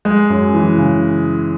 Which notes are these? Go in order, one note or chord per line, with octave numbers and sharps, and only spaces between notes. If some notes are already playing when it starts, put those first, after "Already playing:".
G#3
F#2
E3
C#3